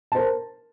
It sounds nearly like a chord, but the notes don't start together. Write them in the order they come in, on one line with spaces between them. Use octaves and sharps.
A5 C5 A#4